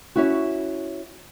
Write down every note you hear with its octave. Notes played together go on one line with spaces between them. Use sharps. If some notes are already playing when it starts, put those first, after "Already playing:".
C#4 E4 F#4